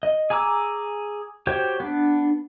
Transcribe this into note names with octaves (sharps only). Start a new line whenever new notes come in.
D#5
G#4 G#5 A#5 D6 E6
F#4 G4 C5 C#5 G5
B3 D4